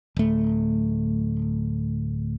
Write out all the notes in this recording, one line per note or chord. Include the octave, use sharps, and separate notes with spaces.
D1 A3